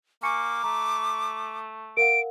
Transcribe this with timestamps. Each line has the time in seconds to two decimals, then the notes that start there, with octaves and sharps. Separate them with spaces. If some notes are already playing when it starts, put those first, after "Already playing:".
0.23 A#3 G#5 C#6 D6 C#7
0.63 A3 A#5
1.97 A#4 F5 F#5 D7